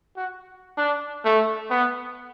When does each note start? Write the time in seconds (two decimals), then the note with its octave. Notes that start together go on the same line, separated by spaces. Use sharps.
0.17 F#4
0.77 D4
1.25 A3
1.70 B3